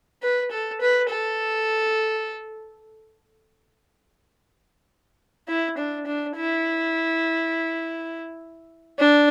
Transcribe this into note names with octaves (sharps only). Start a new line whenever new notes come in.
B4
A4
B4
A4
E4
D4
D4
E4
D4